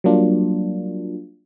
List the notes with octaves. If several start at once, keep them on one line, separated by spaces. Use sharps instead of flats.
F#3 G3 A#3 D4 F4